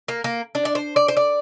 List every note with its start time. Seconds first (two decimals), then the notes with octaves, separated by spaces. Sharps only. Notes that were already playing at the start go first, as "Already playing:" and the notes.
0.08 A#3
0.24 A#3
0.55 D4
0.65 D5
0.75 C5
0.96 D5
1.08 C5
1.17 D5